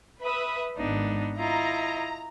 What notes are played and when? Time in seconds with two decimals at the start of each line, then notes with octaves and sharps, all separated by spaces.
0.22 B4 E5 B5 D#6
0.77 G#1 B3 D4 D#4
1.37 E4 F4 D#5 A#5